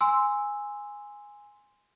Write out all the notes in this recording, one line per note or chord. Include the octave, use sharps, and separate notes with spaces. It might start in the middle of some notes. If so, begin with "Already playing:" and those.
G#5 C6 E6